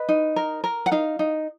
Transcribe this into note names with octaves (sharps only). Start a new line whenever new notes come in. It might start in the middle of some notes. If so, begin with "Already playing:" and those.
Already playing: B4 D#5
D#4
A#4
A#4
F#5
D#4 F5
D#4